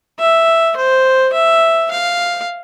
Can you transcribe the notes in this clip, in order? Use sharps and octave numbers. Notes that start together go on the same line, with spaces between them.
E5
C5
E5
F5